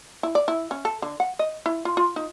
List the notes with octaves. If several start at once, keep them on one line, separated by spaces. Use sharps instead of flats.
E4
D5
E4
C#4
A4
D3
F#5
D#5
E4
F4
F4
D#4